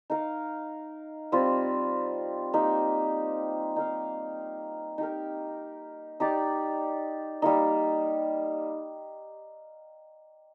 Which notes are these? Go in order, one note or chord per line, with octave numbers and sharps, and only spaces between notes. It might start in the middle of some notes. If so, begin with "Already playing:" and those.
D#4 A#4 F5
G3 C4 F4
A#3 D#4 G4
D#4 A#4 F5
D#4 G4 A#4
D#4 G4 D5
G3 A#3 D#4